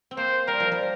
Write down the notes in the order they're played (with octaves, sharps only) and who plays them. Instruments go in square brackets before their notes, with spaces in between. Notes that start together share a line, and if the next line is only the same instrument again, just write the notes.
[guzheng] C4
[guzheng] A#3 [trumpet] C5
[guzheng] G3 [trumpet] A#4
[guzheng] F3
G3